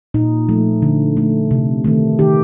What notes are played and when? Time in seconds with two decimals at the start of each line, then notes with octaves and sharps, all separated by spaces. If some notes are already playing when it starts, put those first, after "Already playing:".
0.14 A#2 D#4
0.49 F3 A3
0.82 D3
1.17 A3
1.51 C3
1.84 D#3 A3
2.19 D#3 G4